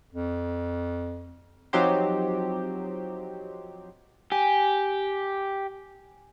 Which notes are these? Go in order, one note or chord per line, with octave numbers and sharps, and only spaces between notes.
F2
F3 F#3 C4 D#4 G4 C5
G4 G#5